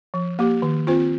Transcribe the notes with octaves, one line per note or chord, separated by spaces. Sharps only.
F3
A#3 G4
D#3
C4 F4 C5